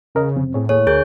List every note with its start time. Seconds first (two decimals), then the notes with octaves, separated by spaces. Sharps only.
0.15 E2 C#3 A#4 D#5
0.37 F2 C3 C4
0.54 A2 C4 G#4 C#5
0.69 D#2 A#3 G#4 C#5
0.87 D2 G#4 A#4 G6